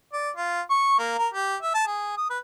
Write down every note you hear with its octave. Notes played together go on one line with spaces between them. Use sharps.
D5
F4
C#6
A#3
A#4
G4
E5
A5
G#4
D#6
B4